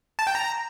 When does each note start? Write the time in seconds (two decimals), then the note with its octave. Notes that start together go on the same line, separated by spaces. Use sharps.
0.19 A5
0.27 G5
0.35 A#5